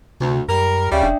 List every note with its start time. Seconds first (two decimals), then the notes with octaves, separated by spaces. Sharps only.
0.20 D2 C3
0.48 F#2 G3 A#4
0.92 D2 C#3 G3 D5 E5 G5
1.03 E1 D4